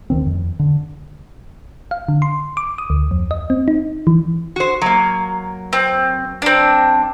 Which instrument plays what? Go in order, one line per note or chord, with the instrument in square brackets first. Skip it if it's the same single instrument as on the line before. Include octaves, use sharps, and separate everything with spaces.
[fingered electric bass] D2 D#3 C4
F2
D3
[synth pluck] F5
D3
C6
D6
D#6
D2
F2
D#5
C4
D#4
E3
[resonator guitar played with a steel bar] F#4 C5
F#3 A#3
[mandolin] C4
C4 D4